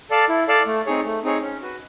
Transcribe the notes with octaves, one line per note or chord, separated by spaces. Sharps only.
A4 D5 F5 A5
E4
A4 D5 F5 A5
A3
C4 D#4 G#4 C#5
A3
C4 D#4 G#4 C#5
C#4
F#4 B4